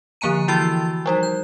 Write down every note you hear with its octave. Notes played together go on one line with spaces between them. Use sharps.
D3 F3 A#3 G#5 A#5 D#7
E3 E4 F#4 E6 A6
F3 G3 D#4
G6